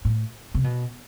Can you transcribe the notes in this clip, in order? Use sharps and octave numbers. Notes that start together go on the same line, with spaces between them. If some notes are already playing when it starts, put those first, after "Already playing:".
A2
C3
B2